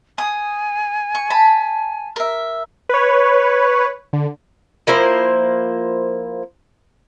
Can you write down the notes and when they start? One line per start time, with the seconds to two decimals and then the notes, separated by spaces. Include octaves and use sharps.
0.18 G#5 D#6
1.15 C#6
1.30 A5 B5
2.16 A#4 E5
2.89 B4 C#5
4.13 D3
4.87 F3 A#3 E4 C5